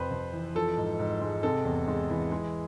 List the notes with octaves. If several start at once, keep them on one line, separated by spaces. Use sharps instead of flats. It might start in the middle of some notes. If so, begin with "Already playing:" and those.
Already playing: F2 C3 B4 C5
F2
E3
F3 A4
G#2
G#2
G#3
C3 A4
E2
G#3
E3
G#3